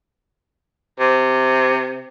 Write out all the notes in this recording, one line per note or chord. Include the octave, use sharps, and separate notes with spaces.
C3